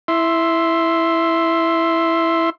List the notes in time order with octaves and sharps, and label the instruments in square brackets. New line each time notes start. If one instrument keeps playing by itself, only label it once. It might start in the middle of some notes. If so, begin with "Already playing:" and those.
[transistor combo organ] E4 E5 C6